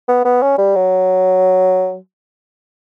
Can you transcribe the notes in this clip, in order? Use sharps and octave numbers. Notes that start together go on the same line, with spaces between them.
B3
B3
C#4
G3
F#3